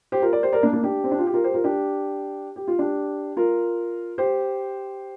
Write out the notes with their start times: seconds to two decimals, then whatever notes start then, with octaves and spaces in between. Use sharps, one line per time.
0.12 G4 C5
0.22 F4 A#4
0.33 A#4 D5
0.42 G4 C5
0.52 A#4 D5
0.63 A#3 D4
0.73 A#3 D4
0.83 D4 G4
1.04 C4
1.11 D4
1.19 F4
1.27 G4
1.33 F4 A#4
1.44 G4 C5
1.54 F4 A#4
1.64 D4 G4
2.56 G4
2.67 F4
2.79 D4 G4
3.37 F4 A#4
4.18 G4 C5